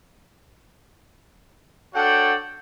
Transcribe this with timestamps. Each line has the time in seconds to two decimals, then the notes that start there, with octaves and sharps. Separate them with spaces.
1.94 D4 F#4 A4 C#5 F#5 G5